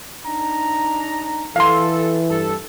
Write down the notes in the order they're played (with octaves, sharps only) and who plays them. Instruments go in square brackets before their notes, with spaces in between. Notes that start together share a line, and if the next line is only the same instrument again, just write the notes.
[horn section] D4 D#4 A#5
[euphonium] E3 [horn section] A4 [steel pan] F5 C6
[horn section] G2 A4